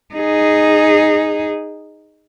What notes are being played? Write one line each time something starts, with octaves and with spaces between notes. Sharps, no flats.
D#4 G#4